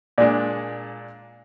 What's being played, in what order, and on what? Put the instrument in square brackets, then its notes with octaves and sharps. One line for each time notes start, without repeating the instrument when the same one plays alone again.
[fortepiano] A#2 G#3 D4 [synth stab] D5